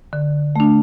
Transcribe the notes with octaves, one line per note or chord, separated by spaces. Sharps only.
D3
A3 D4